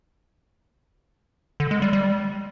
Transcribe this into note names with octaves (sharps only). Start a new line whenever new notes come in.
D3
G#3
G3
G3